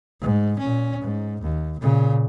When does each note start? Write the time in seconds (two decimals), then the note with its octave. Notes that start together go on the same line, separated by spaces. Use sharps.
0.21 G#2
0.59 A#2 C#4
1.01 G#2
1.41 D#2
1.79 A#2 C#3